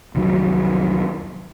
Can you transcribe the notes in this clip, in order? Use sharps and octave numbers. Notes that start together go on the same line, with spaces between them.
C2 F2 D#3 F#3